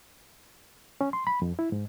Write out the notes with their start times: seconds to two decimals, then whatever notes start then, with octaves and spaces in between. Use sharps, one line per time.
1.01 C#4
1.13 C6
1.27 B5
1.42 F2
1.59 E4
1.72 G#2